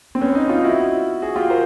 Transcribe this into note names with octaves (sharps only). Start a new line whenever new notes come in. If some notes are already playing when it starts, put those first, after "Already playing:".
C4
B3 C#4
C#4 D#4
D#4 F4
E4 F#4
F#4 G#4
F4 G4
A#4 C5